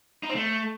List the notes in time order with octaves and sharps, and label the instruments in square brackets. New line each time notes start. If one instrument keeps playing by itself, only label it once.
[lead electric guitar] D#4
C4
A3